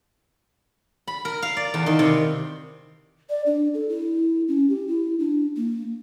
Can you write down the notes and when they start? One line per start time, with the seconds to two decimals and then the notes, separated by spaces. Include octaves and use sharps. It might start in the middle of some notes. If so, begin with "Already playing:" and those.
1.08 B5
1.25 A#4
1.42 F5
1.57 D5
1.74 E2
1.86 D#3
1.99 C3
3.30 D5
3.46 D4
3.74 A4
3.89 E4
4.48 C#4
4.70 G4
4.88 E4
5.19 D4
5.56 A#3